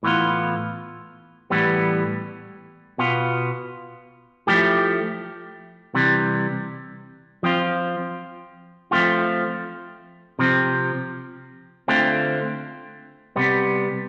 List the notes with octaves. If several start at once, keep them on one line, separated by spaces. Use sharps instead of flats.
A2 E3 B3 F4
A2 E3 G3 B3
B2 B3 F4
F3 A3 E4 G4
C3 E3 G3
F3 C4 F4
F3 A3 C4 F4
C3 F3 C4
D3 A3 C4 F4
C3 G3 B3